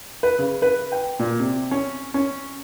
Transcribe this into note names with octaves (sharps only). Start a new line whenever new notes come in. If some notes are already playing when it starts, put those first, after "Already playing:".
B4
C#3
B4
G5
A#2
C3
C#4
C#4